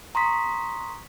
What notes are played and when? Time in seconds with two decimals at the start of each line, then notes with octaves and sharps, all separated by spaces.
0.15 A#5 C6 C#6 D#6 B6